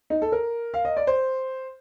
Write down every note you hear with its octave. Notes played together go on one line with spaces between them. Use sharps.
D#4
A4
A#4
F5
D#5
D5
C5